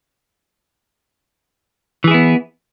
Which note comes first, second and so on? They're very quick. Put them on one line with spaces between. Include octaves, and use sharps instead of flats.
E3 G#4 E4 B3